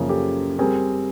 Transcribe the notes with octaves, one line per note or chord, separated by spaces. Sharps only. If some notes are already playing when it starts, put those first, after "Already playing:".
Already playing: F#2 C#3 F3 A#3 G#4
G4 A4
G3 C4 G#4 A#4